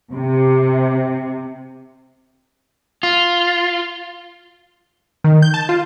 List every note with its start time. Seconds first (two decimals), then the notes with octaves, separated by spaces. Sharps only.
0.13 C3
3.03 F4
5.24 D#3
5.42 G6
5.54 A5
5.69 F4